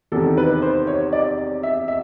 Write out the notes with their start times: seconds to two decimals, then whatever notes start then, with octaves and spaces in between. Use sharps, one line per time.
0.12 E2 C3 D#3 A4
0.37 B4
0.62 C5
0.87 C#5
1.13 D5
1.63 E5
1.88 E5